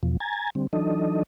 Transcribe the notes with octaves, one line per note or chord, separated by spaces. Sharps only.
E2 B2 F3
G#5 A#5 G#6 A6
D3 G3 C4
E3 F#3 D4 D#4 A4 D#5